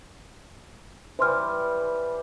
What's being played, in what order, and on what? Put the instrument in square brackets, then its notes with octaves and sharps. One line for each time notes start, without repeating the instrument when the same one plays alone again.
[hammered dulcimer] E3 G3 [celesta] C5 C6 F6